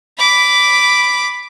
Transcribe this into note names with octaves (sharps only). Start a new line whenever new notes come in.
B5 D6